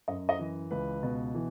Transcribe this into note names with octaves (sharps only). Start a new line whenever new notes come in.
F#2 D#5
D#5
E3
C#2 B4
B2
E3